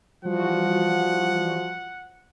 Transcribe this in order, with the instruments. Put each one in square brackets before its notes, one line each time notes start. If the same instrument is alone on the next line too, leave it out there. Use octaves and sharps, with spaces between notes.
[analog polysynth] E3 G3 F#4 [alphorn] F3 [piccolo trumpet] F#5